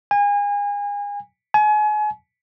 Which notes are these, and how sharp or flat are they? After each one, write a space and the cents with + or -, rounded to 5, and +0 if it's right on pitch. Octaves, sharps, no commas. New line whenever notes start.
G#5 -30
G#5 +35